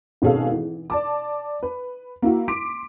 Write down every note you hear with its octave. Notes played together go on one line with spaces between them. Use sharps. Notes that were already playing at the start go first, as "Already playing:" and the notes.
G#1 B2 C#4 G#4 A4 F5
E3
D5 A5 D6
B4
A#3 E4 F#4
C6 D6 B6 D7